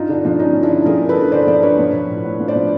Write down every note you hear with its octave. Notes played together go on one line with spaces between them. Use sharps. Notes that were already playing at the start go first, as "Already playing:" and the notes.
Already playing: G2 D#4 F4
D3 D4
F3 D4
G2 C#4 D#4
G2
D4 E4
D3
F3 G#4 A#4
G2
A4 B4
G2
D3 C5 D5
F3 C5 D5
G2 B4 C#5
F3
F3
A2
A2
F3
C5 D5
F3